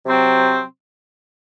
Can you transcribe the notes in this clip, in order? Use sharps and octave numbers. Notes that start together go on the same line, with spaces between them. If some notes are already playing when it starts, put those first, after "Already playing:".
C3 F#3 C4